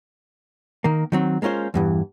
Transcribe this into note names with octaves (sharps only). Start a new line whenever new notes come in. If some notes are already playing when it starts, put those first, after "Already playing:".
D#3 A#3
D#3 F#3 C4
G#3 A#3 C#4 F4 C5
E2 G2 E3